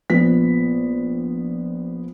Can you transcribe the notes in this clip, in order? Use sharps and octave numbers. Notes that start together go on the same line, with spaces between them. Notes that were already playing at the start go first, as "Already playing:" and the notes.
A#1 F3 B3 B6